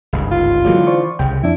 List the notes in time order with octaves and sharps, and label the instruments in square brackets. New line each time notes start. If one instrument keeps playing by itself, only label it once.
[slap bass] G1 C#2 G#2
[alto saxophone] F4
[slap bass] D3 E3 [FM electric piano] F#3 G#3 A#3
[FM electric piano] C5 D5 C#6
[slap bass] C2 C#3 [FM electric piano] G5
[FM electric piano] F2 D4 [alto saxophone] E4